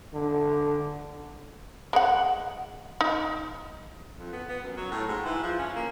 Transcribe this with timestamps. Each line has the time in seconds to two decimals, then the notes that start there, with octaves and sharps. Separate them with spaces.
0.14 D3
1.93 G#3 B4 F#5
3.01 D#4
4.19 F2
4.33 B3
4.49 B3
4.63 F#2
4.77 F#3
4.91 A2
5.08 G#2
5.25 E3
5.43 F3
5.59 C#4
5.76 A#3